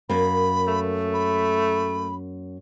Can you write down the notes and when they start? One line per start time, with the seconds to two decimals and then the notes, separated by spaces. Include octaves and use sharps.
0.09 F#2 A#3 B5
0.68 A3
1.14 B5